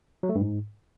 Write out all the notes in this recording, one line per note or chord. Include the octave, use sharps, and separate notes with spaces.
F#3
A3
G2
G#2